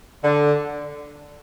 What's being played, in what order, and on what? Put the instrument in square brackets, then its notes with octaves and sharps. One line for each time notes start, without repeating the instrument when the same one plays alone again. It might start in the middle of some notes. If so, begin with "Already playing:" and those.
[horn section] D3